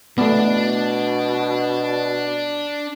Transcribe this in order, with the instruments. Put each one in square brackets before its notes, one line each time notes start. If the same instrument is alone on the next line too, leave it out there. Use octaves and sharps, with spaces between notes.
[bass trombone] B2 [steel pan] A3 B3 [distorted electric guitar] D4 D5